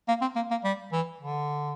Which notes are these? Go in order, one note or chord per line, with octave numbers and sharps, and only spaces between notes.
A#3
C4
A#3
A#3
G3
E3
D3